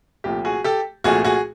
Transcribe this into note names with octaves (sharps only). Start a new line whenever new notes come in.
C2 A#2 F3 A3 G4
F#4 G#4
G4 A4
C2 A#2 F3 A3 F#4 G#4
F#4 G#4